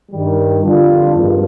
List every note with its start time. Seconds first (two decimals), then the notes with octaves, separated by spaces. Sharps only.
0.10 G2 D#3 G3
0.62 F2 D3 G3 D4 F4
1.14 G#1 G2 F3